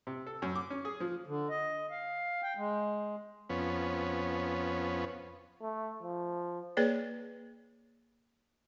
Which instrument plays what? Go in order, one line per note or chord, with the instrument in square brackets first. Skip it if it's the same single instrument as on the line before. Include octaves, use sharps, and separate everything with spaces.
[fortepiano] C3
A4
F#2
D6
C#4
G#4
F3
[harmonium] D3
D#5
F5
G5
G#3
[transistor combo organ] F2 B3 C#4
[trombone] A3
F3
[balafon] A#3 G#4 B4 C#5 D5